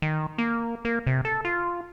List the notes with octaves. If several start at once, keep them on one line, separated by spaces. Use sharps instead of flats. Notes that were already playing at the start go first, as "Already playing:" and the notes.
D#3
A#3
A#3
C3
A4
F4